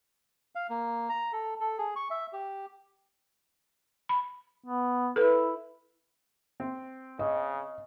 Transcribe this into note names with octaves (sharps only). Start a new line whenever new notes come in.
F5
A#3
A#5
A4
A4
G#4
C#6
E5
G4
B5
B3
E4 A4 B4
C4
C#3 D#5